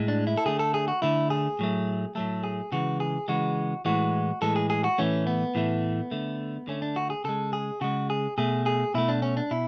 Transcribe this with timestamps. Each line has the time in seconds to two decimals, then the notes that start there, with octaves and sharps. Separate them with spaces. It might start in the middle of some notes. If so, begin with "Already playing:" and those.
Already playing: A2 G#3
0.08 D4
0.27 E4
0.37 A4
0.46 D3 A3 G#4
0.59 A4
0.74 G#4
0.88 F#4
1.02 D3 A3 E4
1.30 G#4
1.59 A2 F#3 A3
2.15 A2 F#3 A3 A4
2.44 G#4
2.72 C#3 E3 G#3 F#4
3.00 G#4
3.28 C#3 E3 G#3 F#4
3.85 A2 E3 G#3 F#4
4.42 A2 E3 G#3 A4
4.56 G#4
4.70 G#4
4.84 F#4
4.98 A2 E3 A3 C#4
5.27 B3
5.55 A2 E3 A3
6.11 D3 A3
6.68 D3 A3 C#4
6.82 D4
6.96 F#4
7.10 G#4
7.24 C#3 G#3 A4
7.53 G#4
7.81 C#3 G#3 F#4
8.10 G#4
8.38 B2 A3 G#4
8.66 G#4
8.94 B2 A3 E4
9.09 D4
9.22 C#4
9.37 D4
9.51 B2 E4